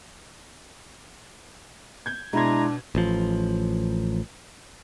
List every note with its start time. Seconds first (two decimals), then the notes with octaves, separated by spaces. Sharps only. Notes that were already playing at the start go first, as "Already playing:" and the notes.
2.06 G6 G#6
2.33 B2 G#3 D4 E4 A#5 C6 G#6
2.95 A1 F3